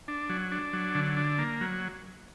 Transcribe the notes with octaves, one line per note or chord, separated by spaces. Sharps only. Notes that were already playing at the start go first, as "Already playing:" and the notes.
D4
F#3
D4
F#3
D3
D4
A#3
F#3